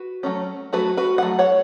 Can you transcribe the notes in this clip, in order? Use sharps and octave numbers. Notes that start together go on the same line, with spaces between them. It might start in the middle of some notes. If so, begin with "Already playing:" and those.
Already playing: F#4 B4
F#3 A3 C#4
F#3 A3 C#4 F#4 B4
F#4 B4
F#5
F#3 A3
C#5 F#5